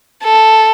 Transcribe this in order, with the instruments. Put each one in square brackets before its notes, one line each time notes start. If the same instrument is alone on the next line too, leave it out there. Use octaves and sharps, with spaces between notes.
[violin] A4